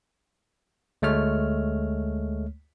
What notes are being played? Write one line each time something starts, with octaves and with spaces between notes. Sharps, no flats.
D2 G#3 A3 C#5 F6